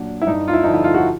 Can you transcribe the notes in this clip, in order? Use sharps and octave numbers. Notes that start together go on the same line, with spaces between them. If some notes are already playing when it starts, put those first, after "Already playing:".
Already playing: A#2 F#3 D4
E4
G2 D#4
F4
E4
D3 F3 D#4
E4
F4
F#4